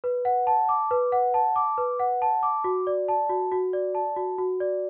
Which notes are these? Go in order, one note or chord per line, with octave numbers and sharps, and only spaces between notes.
B4
F#5
A5
D6
B4
F#5
A5
D6
B4
F#5
A5
D6
F#4
D5
A5
F#4
F#4
D5
A5
F#4
F#4
D5